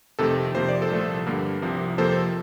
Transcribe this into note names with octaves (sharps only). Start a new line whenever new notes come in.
F2 C3 D#3 A3 A4
F2 C3 F3 A#3 C5
D5
A4 C5
C2 A#2 F3 A3
G2 D3 G3 A#3
C2 C3 F3
F2 C3 F3 A#3 A4 C5